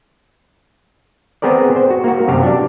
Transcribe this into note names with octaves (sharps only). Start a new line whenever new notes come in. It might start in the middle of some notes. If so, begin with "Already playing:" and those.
B3 C4 G#4 A#4 D5
C5
F#4
A#3 F#4
F#2 C3 G4 F5
D4 D5